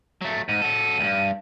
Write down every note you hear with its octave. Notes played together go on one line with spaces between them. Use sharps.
F#3 A3
G#2 D#7
F#3 A4
D2 G2